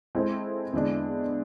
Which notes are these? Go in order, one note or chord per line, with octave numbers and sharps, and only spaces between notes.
G#3 C4 E4 A4 C5
E2 D3 G#3 D4